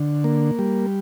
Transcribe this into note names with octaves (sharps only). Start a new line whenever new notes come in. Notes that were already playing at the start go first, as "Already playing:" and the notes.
Already playing: D3
A#3
G3